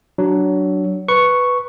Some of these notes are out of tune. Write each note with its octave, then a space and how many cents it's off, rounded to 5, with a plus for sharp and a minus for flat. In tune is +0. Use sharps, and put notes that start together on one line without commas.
F#3 +20 D4 +0
B4 +0 C#6 +0